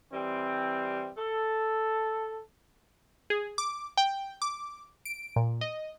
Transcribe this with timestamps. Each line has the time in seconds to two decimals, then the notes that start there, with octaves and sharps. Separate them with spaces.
0.12 E3 G3 C4
1.17 A4
3.30 G#4
3.58 D6
3.97 G5
4.42 D6
5.05 D7
5.36 A#2
5.61 D#5